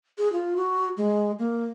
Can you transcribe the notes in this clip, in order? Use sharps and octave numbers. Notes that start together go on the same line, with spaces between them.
G#4
F4
F#4
G#3
A#3